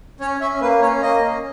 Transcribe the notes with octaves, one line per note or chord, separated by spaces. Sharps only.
C#4 C#5
C#4 E5
A#3 B4
C#4 C#5
A#3 D#5
C#4